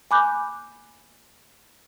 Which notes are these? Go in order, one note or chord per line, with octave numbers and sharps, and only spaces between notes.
G#5 B5 D6 F#6 G6